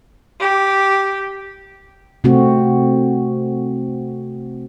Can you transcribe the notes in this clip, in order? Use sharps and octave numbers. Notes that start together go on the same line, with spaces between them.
G4
C3 A3 C4 F#4